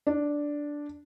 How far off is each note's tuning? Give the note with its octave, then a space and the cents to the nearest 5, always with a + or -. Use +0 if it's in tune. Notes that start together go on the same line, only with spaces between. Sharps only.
D4 -5